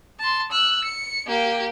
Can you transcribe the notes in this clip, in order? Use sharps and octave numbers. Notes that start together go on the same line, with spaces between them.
A5 C6
E6 F#6
C#7
A#3 G4